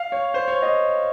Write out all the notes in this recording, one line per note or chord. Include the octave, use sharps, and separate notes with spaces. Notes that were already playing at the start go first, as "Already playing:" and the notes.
Already playing: F5
C#5
C5
C#5
D#5